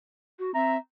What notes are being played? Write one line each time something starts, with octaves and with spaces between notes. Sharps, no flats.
F#4
C4 E5 A#5